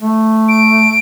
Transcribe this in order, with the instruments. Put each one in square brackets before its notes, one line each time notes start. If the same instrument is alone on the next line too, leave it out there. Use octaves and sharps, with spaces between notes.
[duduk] A3
[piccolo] D7